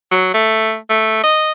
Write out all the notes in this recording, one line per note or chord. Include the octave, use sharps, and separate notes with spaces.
F#3
A3
A3
D#5